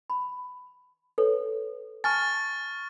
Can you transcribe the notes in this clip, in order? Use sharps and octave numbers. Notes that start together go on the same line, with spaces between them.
B5
A4 B4 C#5
G#5 A5 C#6 F6 A6